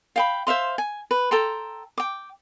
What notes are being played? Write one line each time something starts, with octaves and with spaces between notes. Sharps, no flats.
F5 G5 B5
C5 E5 F5 C6
G#5
B4
A4 G5 A#5 C6
G5 D6